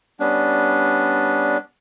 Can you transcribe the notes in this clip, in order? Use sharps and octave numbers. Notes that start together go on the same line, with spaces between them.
G3 B3 C#4 D4